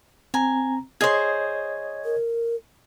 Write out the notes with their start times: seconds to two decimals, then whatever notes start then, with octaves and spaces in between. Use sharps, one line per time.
0.34 C4 G#5 A#5
1.01 G#4 C5 C#5 D#5 G#6
2.05 A#4